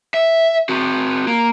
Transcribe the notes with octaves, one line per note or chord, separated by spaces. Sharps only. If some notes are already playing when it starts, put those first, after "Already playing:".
E5
C4 F#4
A#3